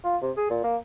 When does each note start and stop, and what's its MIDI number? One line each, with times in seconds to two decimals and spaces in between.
0.04 0.17 65
0.22 0.31 48
0.37 0.46 68
0.50 0.61 46
0.64 0.76 58